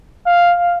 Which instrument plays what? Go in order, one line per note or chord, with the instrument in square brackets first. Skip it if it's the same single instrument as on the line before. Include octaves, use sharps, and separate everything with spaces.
[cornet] F5